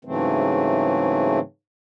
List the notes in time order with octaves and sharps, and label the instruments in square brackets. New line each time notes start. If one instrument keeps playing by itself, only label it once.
[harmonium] G#2 C#3 E3 F#3 A3 C4